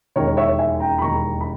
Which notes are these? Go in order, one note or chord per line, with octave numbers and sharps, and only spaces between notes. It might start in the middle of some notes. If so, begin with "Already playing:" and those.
E1 D#2 D#3 A#4 C#5
C#5 E5
E5 G#5
G5 A#5
B5
E1 D#2 D#3 A#5 C#6
B5